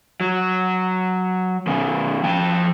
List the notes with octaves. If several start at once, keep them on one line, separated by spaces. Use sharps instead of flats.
F#3
D#3 B3 C#4
F3 G5 A5